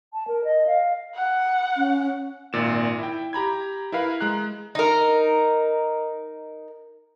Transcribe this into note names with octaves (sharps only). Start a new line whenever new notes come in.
A5
A#4
D#5
F5
F#5
C#4
G#1 A#2 E7
E4 G5
G4 A#5 B5 G#6
E4 A#4 B4 F5 B5
G#3 A#5 F#6
D#4 A#4